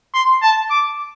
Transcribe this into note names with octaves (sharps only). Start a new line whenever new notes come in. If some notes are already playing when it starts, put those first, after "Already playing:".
C6
A5
D6